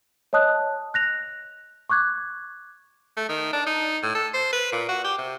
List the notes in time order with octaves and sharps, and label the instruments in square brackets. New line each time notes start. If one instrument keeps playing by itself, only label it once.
[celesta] C#5 D#5 A5 D#6 F#6
F#6 A#6 F7
C#6 D6 F#6 G#6
[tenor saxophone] A3
D#3
D4
D#4
A2
A4
C5
B4
A#2
F#4
G4
C3